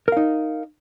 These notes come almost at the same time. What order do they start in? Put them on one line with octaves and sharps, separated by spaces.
A#4 F5 D#4